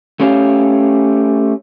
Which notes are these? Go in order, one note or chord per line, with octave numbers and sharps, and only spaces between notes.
A3 C#4 G4 C#5 F5